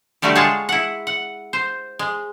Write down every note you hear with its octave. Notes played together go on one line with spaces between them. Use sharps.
D3 G3 A3 F#4 G4
G#3 F4 G#4 C#5 A5
E4 F#5
F#5
C5
G#3